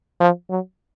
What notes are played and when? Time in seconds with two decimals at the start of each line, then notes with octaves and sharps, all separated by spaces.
0.20 F3
0.50 F#3